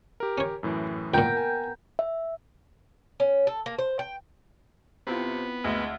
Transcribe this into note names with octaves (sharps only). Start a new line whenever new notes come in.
G4 A#4
C#4 C#5
F#2 A2 E3
C#2 A#2 B3 A#4 G5 G6
G#5
E5
C#4
A4
A#3
C5
G5
C3 B3 C4 E4 F4
D2 G#3